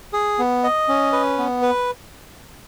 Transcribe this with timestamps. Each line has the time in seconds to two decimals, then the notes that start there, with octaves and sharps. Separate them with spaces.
0.13 G#4
0.39 B3
0.64 D#5
0.89 C#4
1.13 B4
1.38 B3
1.62 B4